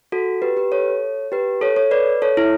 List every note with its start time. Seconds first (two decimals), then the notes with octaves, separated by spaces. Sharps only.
0.12 F#4 A4
0.42 G4 B4
0.57 G4 B4
0.72 A4 C#5
1.32 G4 B4
1.61 A4 C#5
1.76 A4 C#5
1.91 B4 D5
2.22 A4 C#5
2.37 E4